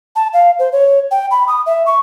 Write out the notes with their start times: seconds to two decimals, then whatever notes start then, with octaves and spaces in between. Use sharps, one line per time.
0.16 A5
0.33 F5
0.59 C5
0.72 C#5
1.11 G5
1.31 B5
1.48 D#6
1.66 E5
1.86 C#6